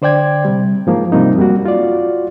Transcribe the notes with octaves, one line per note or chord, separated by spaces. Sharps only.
D3 C5 D5 G5 G#6
C3 G3
G#2 F3 A#3
C3 F3 G3 A#3 C4 D#4
F#2 G3 A#3 F#4
F4 F#4 D5